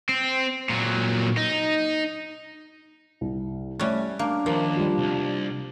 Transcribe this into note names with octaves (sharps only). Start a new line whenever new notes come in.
C4
A#2 F#3
D#4
C2
G3 A3 C#4 F#6
A#3 D4
D#2 F3 A#4
G3 F4
C2